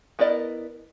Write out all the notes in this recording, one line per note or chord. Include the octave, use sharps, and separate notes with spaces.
B3 E4 A#4 D5 D#5